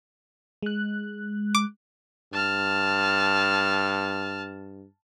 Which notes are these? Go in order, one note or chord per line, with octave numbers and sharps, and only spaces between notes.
G#3 F#6
D6
G2 A5 F6